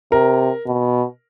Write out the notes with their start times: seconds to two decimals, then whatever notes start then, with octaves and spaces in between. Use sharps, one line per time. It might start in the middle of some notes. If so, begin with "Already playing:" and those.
0.12 C3 A#4
0.67 B2